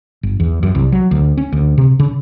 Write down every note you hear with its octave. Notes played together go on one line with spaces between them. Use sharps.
G1
E2
F#2
C2
F#3
D2
C#4
D2
C3
C#3